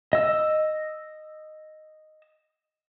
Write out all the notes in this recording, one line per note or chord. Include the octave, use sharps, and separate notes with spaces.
D#5 E6